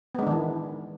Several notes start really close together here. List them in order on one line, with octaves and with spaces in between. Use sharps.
B3 G#3 D4 D#3 E3